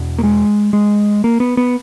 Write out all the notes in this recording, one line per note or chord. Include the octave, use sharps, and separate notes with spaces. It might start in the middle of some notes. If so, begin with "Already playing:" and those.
Already playing: E2 B2
A#3
G#3
G#3
A#3
B3
B3